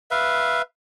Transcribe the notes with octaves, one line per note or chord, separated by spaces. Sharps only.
B4 E5 F5